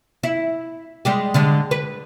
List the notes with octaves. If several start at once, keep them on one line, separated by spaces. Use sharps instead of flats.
E4
G3 G#3 G4
D3 G3 G#3
B4